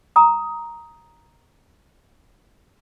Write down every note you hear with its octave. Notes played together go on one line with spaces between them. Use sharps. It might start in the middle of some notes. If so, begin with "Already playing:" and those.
A#5 D#6